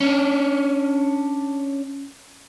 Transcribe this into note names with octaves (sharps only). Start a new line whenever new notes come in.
C#4 D4